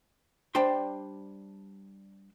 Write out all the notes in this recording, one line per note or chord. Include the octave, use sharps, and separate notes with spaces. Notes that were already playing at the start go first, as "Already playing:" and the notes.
G3 D4 C5 G5 C6